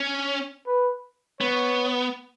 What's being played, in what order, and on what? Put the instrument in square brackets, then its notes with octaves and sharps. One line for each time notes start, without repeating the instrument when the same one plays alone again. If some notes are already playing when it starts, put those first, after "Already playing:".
Already playing: [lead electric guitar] C#4
[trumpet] B4
[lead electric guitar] B3 [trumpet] C#5